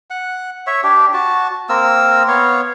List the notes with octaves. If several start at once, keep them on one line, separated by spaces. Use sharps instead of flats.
F#5
C#5 E5
D4 G4
F#4 A5
A#3 C4 A#4 E6
B3 C#5 F5